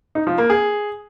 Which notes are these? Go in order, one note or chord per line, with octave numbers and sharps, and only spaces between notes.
D#4
F3
A#3
G#4